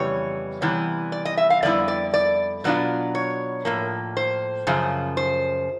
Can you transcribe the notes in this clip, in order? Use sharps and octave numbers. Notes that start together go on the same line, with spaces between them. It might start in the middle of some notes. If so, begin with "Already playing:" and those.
Already playing: F2 C#3 E3 G3 B3 C#5
C3 E3 G3 B3
D5
D#5
E5
F5
F2 D3 G3 B3 E4 D5
D5
D5
B2 F#3 B3 D4 F4
C#5
A2 F3 A#3
C5
F#2 C#3 F3
C5